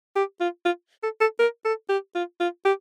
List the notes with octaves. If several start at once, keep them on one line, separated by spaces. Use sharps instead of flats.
G4
F4
F4
A4
A4
A#4
A4
G4
F4
F4
G4